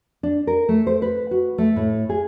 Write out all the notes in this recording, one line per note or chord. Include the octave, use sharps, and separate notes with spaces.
D4
A#4
A3
C5
B4
F#4
A3
A2
G#4